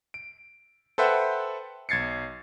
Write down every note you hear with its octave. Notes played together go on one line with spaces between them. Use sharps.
D7
A4 B4 C5 E5 F#5 G5
B1 G#6 A6 C7 C#7